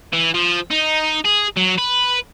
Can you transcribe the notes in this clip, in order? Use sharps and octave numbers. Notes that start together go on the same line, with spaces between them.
E3
F3
D#4
G#4
F#3
B4